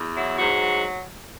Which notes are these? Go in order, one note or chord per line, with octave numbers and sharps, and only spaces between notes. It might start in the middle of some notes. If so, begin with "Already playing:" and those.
Already playing: E2
F#3 E4
G#2 F#4
F#3